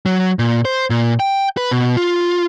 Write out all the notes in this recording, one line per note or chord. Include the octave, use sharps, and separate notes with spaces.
F#3
A#2
C5
A#2
G5
B4
B2
F4